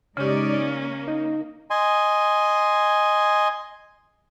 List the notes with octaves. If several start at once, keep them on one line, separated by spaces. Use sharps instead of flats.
C#3 G#3 C#4 D#4 G4 D5
A#3
D#4
D#5 G#5 C6